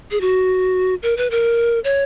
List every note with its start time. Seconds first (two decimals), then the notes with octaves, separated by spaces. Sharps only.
0.11 G#4
0.21 F#4
1.03 A#4
1.17 B4
1.31 A#4
1.84 C#5